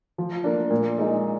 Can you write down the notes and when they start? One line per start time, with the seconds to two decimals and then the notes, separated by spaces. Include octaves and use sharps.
0.18 F3
0.44 A#3 D4
0.71 A#2
0.98 G#3 D#4